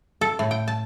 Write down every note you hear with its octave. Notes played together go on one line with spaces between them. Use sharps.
A4
A2
G5
A5